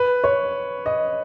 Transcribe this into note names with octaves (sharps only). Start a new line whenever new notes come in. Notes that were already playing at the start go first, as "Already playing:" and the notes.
Already playing: B4
C#5
D#5